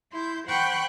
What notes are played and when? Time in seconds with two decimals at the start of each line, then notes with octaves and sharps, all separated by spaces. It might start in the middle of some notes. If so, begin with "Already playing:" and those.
0.11 E4 C6 G6
0.47 C5 F#5 G5 B5 C#6 F#6